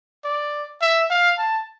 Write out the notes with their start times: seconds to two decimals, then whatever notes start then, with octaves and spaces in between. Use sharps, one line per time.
0.24 D5
0.81 E5
1.10 F5
1.38 A5